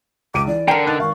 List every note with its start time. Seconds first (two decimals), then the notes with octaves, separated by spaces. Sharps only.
0.34 C#2 D6 D7 D#7
0.47 E3 D5
0.68 D3 A#4 G5 A#5
0.87 D#4 A5 F#6 A6
1.00 G#1 F5 C#6